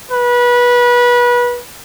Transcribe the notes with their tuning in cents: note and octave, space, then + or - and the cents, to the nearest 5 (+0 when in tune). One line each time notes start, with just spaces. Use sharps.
B4 -25